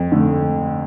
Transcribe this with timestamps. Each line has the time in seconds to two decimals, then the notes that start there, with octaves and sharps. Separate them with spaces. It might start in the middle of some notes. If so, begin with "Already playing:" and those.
Already playing: F2
0.12 D3 A3